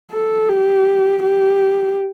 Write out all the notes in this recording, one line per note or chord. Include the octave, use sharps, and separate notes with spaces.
A4
G4
G4